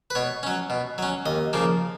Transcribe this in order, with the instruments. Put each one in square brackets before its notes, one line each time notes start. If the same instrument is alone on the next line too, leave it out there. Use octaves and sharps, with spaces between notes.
[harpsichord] B4
B2 C#5
F#3 C#4
B2
F#3 C#4
D#2 D#5
C#3 F3 A#3